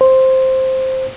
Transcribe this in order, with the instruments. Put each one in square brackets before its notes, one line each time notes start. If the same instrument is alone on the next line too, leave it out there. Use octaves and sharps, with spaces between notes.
[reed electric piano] C5